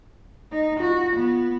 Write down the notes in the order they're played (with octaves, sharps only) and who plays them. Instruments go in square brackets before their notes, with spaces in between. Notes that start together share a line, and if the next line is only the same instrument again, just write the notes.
[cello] D#4
[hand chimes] F4 [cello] F#4
[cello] B3